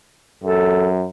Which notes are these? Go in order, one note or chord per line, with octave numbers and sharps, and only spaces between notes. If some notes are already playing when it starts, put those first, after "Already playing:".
F#2 A4